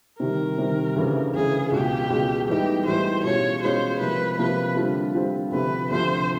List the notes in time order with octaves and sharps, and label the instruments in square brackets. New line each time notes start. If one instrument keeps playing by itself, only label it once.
[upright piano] C3 D#3 G3 [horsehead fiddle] A#4
[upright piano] C3 D#3 G3
D2 C#3 E3
[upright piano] D2 C#3 E3 [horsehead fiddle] G#4
[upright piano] C#2 B2 G#3 [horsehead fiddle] G4
[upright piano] C#2 B2 G#3
[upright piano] A2 E3 G3 B3 D#4 [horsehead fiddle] G4
[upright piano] A2 E3 G3 B3 D#4 [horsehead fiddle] C5
[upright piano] B2 G#3 C#4 F4 [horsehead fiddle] C#5
[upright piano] B2 G#3 C#4 F4 [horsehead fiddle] C5
[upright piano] C3 F3 A#3 [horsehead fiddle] B4
[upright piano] C3 F3 A#3 [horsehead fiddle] B4
[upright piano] D3 G3 C4 F4
D3 G3 C4 F4
[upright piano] D2 C3 F3 [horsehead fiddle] B4
[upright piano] D2 C3 F3 [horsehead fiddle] C5